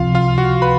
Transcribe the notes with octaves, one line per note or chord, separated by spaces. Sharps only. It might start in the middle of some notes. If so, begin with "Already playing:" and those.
Already playing: C#2 C3 F3 F4 F5
F4 F5
F#4 F#5
B4 B5